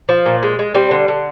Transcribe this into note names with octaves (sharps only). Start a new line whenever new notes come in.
F3
A#2
G#3
G#3
G3 C4
D3
D3